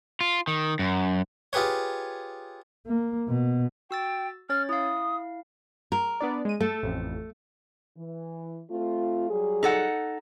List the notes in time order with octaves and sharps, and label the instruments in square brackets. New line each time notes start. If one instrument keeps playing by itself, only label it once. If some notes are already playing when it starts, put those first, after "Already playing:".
[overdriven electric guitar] F4
D#3
F#2
[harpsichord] F4 G4 G#4 B4 C#5
[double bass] A#3
B2
[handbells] F#4 E6 A6 [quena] G5
[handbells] C#4 C#5 A6 [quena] F6
[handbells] E4 F5 [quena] D#6
[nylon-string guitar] A#4
[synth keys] B3 D4 D5
G#3 D#7
[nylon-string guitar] A3 [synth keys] A4
[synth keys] A1 F2
[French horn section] E3
A3 C4 F4
F#3 G3 G#4
[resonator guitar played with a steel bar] D#4 A4 F#5